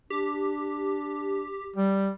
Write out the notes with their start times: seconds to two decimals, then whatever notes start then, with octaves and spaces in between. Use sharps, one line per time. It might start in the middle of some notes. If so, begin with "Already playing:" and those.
0.10 D4 G4
1.76 G3 G4